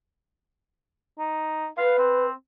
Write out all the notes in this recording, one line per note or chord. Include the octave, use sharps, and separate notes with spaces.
D#4
B4 F5
C4